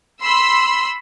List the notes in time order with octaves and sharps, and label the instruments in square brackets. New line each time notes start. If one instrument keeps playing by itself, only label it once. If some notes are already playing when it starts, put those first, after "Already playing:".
[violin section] B5 C6 E6